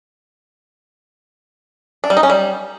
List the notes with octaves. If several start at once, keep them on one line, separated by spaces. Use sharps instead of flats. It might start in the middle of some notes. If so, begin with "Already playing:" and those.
D4
G3
D#4
C#4
G3